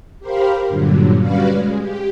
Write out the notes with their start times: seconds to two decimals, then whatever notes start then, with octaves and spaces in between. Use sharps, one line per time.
0.20 G4 A#4 C5 F5 B5
0.67 G2 A#2 D3 F#3
1.19 G3 C#4 F#4 B4 D5 F5
1.49 G#3
1.79 G4